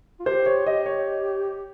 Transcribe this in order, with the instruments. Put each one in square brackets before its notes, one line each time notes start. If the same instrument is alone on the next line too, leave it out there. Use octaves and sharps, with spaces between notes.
[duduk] F4
[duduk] G4 [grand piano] C5
[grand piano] C#5
[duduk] G4 [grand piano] D#5
[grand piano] C#5